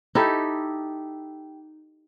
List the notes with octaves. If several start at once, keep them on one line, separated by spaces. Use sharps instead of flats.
D#4 E4 G4 A4